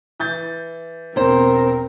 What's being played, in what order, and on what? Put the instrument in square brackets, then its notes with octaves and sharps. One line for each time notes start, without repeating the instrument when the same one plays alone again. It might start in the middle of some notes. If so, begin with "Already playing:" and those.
[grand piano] E3 G6 A6
[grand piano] E1 C5 [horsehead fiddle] C4 A#4